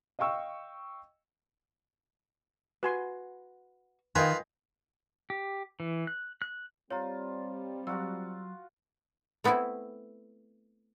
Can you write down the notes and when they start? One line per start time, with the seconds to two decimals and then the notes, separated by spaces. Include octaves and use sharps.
0.19 D#5 F5 G5 C#6 E6
2.83 F#4 B4 G#5 C6
4.15 D#3 F4 A#4 B4 D#5 F5 G5 G#5
5.30 G4
5.80 E3
6.07 F#6
6.42 F#6
6.90 G3 C4 F4 C#5 A#5
7.87 F#3 F4 F#4 F#5 E6
9.44 A3 B3 C4 E4 G#5